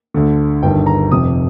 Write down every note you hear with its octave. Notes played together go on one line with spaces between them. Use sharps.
D2 D3
G1 G2 D#3 G5
A#5
F1 F2 C3 D#6